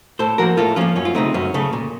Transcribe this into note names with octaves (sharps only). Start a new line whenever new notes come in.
A2 A4 C5
F3 A#3 F#4 A#4
A2 F4 A4
F3 A#3 C#4 F4
F#2 C#4
F4
C#3 A3 C4 D#4
F#2 C#4
C#3 A3
A#2